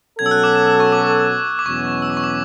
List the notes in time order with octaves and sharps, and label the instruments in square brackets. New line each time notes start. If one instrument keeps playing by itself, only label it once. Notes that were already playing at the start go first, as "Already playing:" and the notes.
[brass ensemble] B2 F#3 C#4 F#4 A4 [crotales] G#6
[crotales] E6
F#6
D6
D6
E6
C#6
D6
D6
[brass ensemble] E2 B2 F#3 C#4 [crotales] C#6
[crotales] E6
D6
C#6
D6